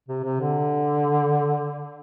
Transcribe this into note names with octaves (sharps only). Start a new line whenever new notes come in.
C3
C3
D3